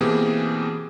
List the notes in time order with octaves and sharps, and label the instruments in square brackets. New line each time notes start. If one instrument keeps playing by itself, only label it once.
[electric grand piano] B2 E3 A#3 C4 G4 G#4